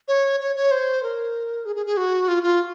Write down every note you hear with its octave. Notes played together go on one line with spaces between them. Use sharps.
C#5
C#5
C#5
C5
A#4
G#4
G#4
G#4
F#4
F4
F4